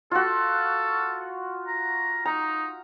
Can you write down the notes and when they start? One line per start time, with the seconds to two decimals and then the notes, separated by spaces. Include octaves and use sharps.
0.11 F4 F#4 A4
1.67 A#5
2.25 D#4 A#5